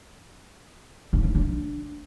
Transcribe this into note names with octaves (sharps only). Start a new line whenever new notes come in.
D4
C#4
D4